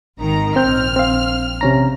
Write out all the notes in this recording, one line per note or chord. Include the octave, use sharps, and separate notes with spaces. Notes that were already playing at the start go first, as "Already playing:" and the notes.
G#1 D#3 A#5
A#1 C4 F6 G6
C4 F5
C3 C#4 A#5